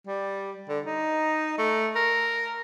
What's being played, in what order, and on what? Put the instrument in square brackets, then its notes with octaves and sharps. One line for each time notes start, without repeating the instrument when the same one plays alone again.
[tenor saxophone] G3
D3
D#4
A3
A#4